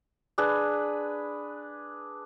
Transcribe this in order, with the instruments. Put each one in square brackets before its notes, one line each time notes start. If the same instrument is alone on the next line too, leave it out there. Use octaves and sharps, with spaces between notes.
[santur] D4 G#4 B4